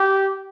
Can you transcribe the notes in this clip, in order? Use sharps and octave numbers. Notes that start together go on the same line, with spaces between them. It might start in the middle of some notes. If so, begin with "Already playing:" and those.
Already playing: G4